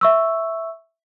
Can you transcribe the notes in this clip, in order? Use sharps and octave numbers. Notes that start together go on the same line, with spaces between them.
E5 C#6 E6